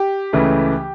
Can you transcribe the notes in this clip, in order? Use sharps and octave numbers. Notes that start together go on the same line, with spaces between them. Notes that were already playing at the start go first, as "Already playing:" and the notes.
Already playing: G4
C#2 C#3 E3 A3